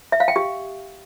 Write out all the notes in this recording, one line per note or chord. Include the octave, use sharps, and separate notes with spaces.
E5
F5
G5
G4